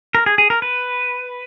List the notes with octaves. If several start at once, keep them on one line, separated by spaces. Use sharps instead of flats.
A#4
G#4
G#4
A#4
B4